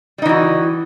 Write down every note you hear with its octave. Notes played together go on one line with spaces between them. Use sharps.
E3 G3 D#4 F#4